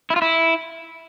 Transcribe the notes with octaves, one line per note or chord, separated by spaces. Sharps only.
E4
F4
E4